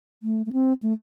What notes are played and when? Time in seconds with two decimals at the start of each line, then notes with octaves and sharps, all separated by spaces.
0.23 A3
0.46 A3
0.53 C4
0.83 A3